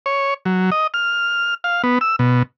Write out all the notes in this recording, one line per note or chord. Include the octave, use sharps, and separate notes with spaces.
C#5
F#3
D#5
F6
F5
B3
E6
B2